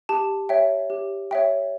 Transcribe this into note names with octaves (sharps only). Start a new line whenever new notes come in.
G4 A5
C#5 E5 G5
G4
C#5 E5 G5